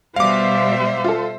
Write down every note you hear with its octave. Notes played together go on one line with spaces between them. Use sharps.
B2 G3 C5 E5 F5 D6
F4 A4